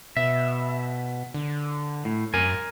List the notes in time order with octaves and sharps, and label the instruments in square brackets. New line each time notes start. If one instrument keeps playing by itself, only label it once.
[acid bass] B2 [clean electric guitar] E5
[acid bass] D3
[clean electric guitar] A2
[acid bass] F#2 [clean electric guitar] A#4 G#5